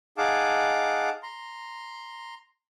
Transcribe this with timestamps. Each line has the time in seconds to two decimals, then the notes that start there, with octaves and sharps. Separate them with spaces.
0.18 D#4 G#4 F5 F#5 A5 D6
1.23 A#5 C6